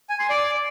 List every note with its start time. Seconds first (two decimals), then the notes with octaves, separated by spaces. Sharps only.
0.09 G#5
0.19 C6
0.30 D5